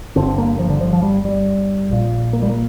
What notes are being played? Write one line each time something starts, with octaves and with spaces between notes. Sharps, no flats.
G1 G2 D3 C4
A#3
F3
D3
F3
F3
G3
G3
A#1 A#2
A#3
G3
A#3